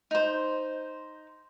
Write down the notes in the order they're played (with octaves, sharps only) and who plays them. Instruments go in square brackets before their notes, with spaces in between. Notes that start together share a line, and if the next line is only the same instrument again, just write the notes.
[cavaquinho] D#4 C5